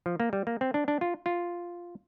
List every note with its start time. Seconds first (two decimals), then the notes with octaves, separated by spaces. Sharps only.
0.06 F3
0.20 A#3
0.33 G3
0.47 A#3
0.61 C4
0.74 D4
0.88 D4
1.01 F4
1.26 F4